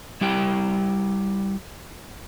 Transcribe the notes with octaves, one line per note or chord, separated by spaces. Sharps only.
G3 E4 G4 G5